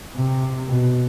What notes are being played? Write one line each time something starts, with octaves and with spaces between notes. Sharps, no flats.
C3
B2